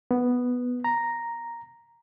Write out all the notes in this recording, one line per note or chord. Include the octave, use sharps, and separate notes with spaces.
B3
A#5